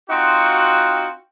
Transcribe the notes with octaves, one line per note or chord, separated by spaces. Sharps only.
C4 D#4 F4 F#4